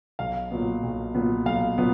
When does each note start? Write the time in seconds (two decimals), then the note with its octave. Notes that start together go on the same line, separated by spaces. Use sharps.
0.19 B1 F5
0.51 A#2 F#3 B3
0.83 B1
1.14 A#2 F#3 B3
1.46 B1 F5
1.78 A#2 F#3 B3